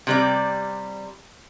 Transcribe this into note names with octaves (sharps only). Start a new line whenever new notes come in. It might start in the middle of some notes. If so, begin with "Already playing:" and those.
C3 G3 D5